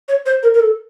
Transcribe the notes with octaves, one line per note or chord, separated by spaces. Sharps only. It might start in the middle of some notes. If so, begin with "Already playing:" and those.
C#5
C5
A#4
A#4
A4